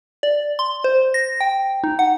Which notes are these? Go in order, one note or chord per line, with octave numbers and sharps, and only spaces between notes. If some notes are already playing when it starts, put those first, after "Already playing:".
D5
C6
C5
A#6
G5
D#4
F#5